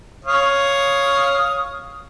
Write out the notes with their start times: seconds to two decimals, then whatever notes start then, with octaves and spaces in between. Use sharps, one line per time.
0.25 C#5 F5 D#6